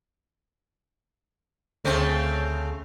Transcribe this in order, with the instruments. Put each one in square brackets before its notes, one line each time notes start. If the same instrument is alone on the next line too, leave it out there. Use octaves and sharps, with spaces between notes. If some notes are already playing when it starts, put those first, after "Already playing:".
[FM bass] D2 [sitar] C#3 A3 C4